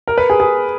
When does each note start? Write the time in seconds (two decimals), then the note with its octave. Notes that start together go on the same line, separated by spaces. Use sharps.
0.08 A#4
0.18 B4
0.30 G#4
0.40 G#4